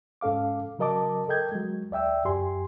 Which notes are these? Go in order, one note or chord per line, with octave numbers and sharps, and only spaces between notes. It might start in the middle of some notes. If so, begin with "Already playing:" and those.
G#2 C#4 A4 F5 D6
C#3 F#3 A#4 D#5 A5 D6
A4 A#4 D#5 G5 G6 G#6
F#3 G#3
D2 D5 E5 G5 E6
F#2 G4 G#5 C6